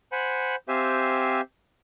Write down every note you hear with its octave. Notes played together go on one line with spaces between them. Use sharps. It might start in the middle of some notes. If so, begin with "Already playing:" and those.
C5 F#5 G#5 B5
C4 G4 C5 E5 F5 G#5